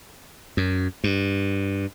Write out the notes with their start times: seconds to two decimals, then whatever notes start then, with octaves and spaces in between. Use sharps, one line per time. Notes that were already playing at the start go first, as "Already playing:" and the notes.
0.57 F#2
1.04 G2